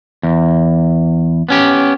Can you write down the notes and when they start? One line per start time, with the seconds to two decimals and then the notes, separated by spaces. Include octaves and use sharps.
0.23 E2
1.49 B3 C#4 G4